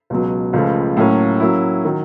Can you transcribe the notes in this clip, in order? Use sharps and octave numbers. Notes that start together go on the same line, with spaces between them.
C#2 B2 F#3
C#2 C#3 F3 A3
A2 F#3 A#3 C#4
F#3 A#3 C#4 E4
D#3 F#3